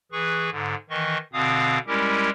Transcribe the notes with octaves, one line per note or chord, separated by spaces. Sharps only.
E3 G#4 B4 C#6
G#2 D3
D#3 E3 D#5 C#6
B2 D3 C4 F5 D#6
G3 G#3 C#4 E4 G4 A#4